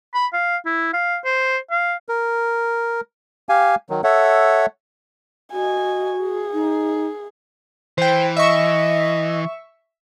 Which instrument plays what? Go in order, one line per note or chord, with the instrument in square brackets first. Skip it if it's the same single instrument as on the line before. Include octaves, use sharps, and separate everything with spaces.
[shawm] B5
F5
E4
F5
C5
F5
[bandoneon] A#4
G4 F5 G#5
D#3 F#3
A4 C#5 E5 F#5
[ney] F#4 [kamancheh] D#5 G#5
[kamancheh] G#4
[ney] D#4
[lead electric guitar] E3 [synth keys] C5 G5
[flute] D#5 [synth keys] E5 C#6